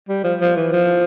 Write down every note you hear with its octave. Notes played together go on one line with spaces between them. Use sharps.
G3
F3
F3
E3
F3